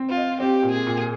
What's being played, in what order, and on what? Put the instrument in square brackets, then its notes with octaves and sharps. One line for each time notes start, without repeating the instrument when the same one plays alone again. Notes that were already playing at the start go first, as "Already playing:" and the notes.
Already playing: [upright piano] C4 C5
[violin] F4
[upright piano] D#5
[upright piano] C4 [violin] G4
[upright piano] A#2
[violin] G#4
[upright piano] A#2